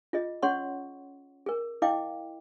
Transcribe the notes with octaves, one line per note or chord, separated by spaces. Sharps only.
F4 G#4 D#5
C#4 G#4 C#5 F#5 C6 C#6
G#4 A#4
E4 D#5 F5 G5 D6